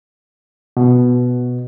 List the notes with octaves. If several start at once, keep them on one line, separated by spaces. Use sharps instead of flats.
B2